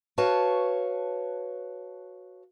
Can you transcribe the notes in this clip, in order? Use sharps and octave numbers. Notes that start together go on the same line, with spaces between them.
F#4 B4 C#5 F5 A5